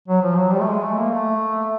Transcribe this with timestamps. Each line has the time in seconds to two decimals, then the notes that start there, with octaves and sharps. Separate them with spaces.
0.08 F#3
0.22 F3
0.37 F#3
0.52 G3
0.60 A3
0.67 G#3
0.83 A3
0.97 A#3
1.11 A3